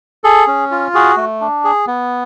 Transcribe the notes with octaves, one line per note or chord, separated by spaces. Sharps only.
G#4 A4
C#4
F4
F#4 G#4
A3
D4
G#4
B3